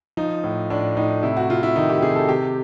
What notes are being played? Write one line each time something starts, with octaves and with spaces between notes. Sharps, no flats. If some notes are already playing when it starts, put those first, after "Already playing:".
F3 D#4
A2
A2 D4
A2 D#4
C3 E4
F#4
C3 F4
E4
D#3 D#4
G4
C3 G#4
A4
C3 G4